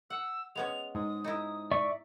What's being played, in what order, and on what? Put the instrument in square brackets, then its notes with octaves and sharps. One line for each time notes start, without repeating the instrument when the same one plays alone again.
[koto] F#5 [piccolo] E6
[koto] G#3 B3 C#4 [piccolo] F7
[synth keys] G#2 [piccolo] D#6
[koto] D#4 E4
[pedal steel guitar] D5 E5 C#6